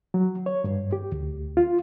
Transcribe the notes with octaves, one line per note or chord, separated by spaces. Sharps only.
F#3
C#5
G2
G4
D2
F4